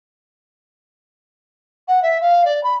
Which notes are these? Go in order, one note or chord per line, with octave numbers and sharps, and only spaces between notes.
F#5
E5
F5
D5
B5